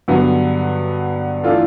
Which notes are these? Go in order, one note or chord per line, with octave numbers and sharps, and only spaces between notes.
G2 D3 F#3 B3
E3 A3 D4 F4 A4